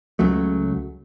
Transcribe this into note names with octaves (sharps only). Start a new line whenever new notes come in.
C#2 C#3 F#3 A3